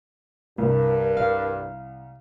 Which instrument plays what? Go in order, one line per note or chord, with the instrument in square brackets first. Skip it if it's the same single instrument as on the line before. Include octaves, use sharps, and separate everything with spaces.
[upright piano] C2 [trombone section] G2 [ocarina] A#4
[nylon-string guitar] F5